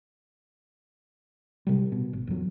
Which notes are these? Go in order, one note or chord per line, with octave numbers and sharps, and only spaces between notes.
C3 G3
B2
G#1
E2 F#3